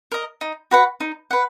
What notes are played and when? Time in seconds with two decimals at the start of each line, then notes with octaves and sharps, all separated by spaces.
0.12 A#4 D#5
0.41 D#4
0.71 F#4 B4 F#5
1.00 D#4
1.31 B4 F#5